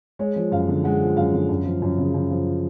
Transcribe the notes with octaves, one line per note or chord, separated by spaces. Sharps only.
G#3 C#5
F3
F#2 F5
D3
G#3 F#5
F3
F#2 F5
D3
F#2
F3
F#2
C#3
F#2
F3